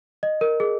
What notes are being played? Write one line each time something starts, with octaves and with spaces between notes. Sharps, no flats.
D#5
A#4
G#4